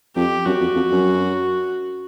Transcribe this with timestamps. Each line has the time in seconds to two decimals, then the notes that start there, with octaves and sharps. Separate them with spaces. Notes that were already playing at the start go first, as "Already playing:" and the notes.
0.16 F2 G4
0.45 F#2 F#4
0.61 F2
0.76 F2
0.91 F#2